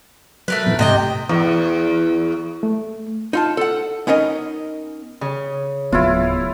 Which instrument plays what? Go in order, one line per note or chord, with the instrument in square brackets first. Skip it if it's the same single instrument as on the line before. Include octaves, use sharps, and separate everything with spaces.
[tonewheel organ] F#3 F#6 [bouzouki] A3 A#4 B4
[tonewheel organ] A#2 E3 B3
[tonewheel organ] G#2 A3 [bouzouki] C3 D#5 G5
[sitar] E2
[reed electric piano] A3
[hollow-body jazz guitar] D#4 F4 A5
A4 F#5
B3 C#4 D#4 A#4 D#5
[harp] C#3
[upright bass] D1 F#3 [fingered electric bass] B3 [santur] E4 F4